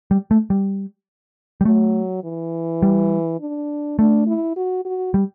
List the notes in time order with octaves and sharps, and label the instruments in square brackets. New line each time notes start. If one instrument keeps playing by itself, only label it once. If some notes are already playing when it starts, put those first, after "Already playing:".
[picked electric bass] G3
A3
G3
G3
[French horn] F#3 [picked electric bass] A3
[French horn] E3
[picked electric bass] G3
[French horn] D4
[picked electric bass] A3 [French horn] D4
[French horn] E4
F#4
F#4
[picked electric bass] G3